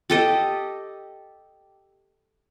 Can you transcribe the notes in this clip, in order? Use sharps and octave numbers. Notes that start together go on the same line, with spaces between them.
G4 A4 D#5